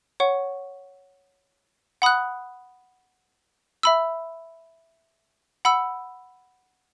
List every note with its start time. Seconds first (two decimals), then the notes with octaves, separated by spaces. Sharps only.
0.20 C#5 F#5 C#6
2.02 F#5 B5 D#6 F#6
3.83 E5 B5 E6
5.65 F#5 B5 E6